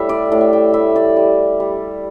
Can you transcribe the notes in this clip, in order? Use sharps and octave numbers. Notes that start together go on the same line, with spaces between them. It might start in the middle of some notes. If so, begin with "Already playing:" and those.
Already playing: A2 G3 E5
D5
A2
E5
G5
G3 E5
D5
G3
G3